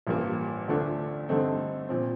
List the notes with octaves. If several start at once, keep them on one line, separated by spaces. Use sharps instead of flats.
A1 G2 F3 A#3
D2 D3 F3 A3 D4
G2 D3 A3 C4 D#4
A#2 F3 C4